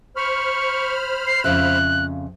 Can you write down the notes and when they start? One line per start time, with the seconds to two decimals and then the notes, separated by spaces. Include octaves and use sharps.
0.16 C5 B5 C#6 F6
1.27 C7
1.44 F2 C#3 E5 F#6